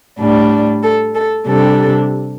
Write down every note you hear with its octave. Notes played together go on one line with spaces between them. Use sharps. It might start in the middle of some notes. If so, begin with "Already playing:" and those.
A2 G3 D4
A4
A4
C3 G3 D4 A4